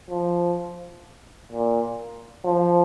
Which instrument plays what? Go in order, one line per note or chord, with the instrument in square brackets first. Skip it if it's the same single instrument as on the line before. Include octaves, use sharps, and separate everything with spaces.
[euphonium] F3
A#2
F3